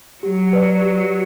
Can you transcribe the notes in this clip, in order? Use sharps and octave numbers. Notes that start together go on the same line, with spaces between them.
F#3 G4
B4 D5
G4